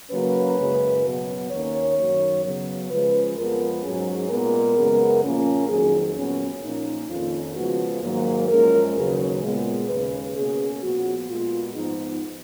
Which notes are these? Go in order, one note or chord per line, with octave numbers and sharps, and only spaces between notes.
C#3 F#3 A#3 C#4 B4
F#2 C#3 G#3
B2 F#3 B3
D#2 D#3 A#3 C#4 C#5
F#2 D#3 F#3
C#3 F#3 B3
C#3 F3 G#3 C#4 B4
F2 F3 G#3 B3 A#4
G#2 F#3 C#4 G#4
A#2 G#3 B3 A#4
F#2 C#3 G#3 B3
A#2 F3 A#3 C#4
F2 D#3 F#3 G#4
A#2 F#3 B3 C#4
A#2 F3 A#3 C#4 D#4
F2 D#3 A#3 C#4 F4
C#3 F3 G#3 B3 F#4
G#2 D#3 F#3 A#3
F#2 F3 G#3 C#4 A#4
D#2 C#3 F#3 B4
A#2 G#3 B3
D#2 C#3 G#3 C#4 B4
B2 A#3 C#4 G#4
A#2 F3 B3 F#4
A#2 G#3 B3 F4
G#2 F3 B3 D#4